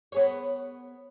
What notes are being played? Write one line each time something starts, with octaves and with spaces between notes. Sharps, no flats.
B3 G#4 C#5